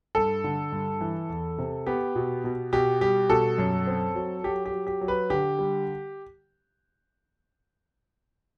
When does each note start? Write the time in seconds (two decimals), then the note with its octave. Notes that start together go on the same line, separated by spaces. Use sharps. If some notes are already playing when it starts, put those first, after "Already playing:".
0.15 G2 A4
0.44 D3
0.72 G2
1.01 E3
1.29 E2
1.58 C3
1.87 B3 G4
2.16 B2
2.44 B2
2.73 B2 G4
3.01 G3 G4
3.29 B2 A4
3.58 F#2
3.87 C4
4.15 F#3
4.44 F#3 G4
4.66 G4
4.72 F#3
4.87 G4
5.01 F#3
5.08 B4
5.30 D3 G4
5.59 G3